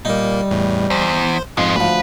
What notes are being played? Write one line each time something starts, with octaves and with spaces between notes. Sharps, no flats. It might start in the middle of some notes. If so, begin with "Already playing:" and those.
A#2 G3 A#3 D#4
E2 A2
E2 C5
F2 G#2 F3 G#3
D2 F3 B4